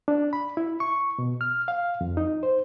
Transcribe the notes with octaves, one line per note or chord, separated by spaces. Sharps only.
D4
B5
E4
C#6
B2
F6
F5
F2
D#4
C5